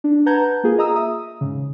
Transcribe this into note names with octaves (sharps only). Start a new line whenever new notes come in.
D4
B4 F#5 A5 A#5 G6 G#6
A#3 F4 G#4
D#5 A#5 D#6 E6
E5 D#6
G#2 C#3